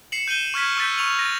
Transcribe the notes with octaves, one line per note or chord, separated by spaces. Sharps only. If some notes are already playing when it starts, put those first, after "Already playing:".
C7 C#7 E7 F#7
G6 D#7 E7 G7
C#6 F6 G#6 B6
C#6 E6 G6 A6 B6
C#6 F7 F#7
A6 A#6